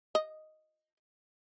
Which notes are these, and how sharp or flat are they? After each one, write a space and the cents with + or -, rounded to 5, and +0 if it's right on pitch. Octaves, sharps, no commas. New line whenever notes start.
D#5 +0